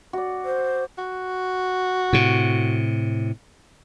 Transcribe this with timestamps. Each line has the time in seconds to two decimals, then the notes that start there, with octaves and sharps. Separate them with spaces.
0.13 F#4 D5
0.45 C5
0.98 F#4
2.13 A2 C3